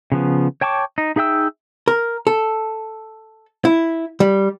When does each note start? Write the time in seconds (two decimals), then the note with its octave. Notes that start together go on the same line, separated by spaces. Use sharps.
0.12 C#3 F3 B3
0.61 C#5 G5 A5 C#6 D6
0.98 D#4
1.16 D#4 G#4 E5 G5 E6
1.88 A#4
2.27 A4
3.65 E4
4.20 G3